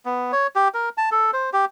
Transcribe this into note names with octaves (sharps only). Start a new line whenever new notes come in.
B3
C#5
G4
A#4
A5
A4
C5
G4